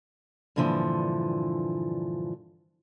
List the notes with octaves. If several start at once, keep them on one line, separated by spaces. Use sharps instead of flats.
G2 A#2 D3 E3 F3